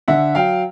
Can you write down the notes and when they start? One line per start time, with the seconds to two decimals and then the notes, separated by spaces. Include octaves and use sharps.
0.08 D3 E5 F#5
0.35 F#3 F5 G5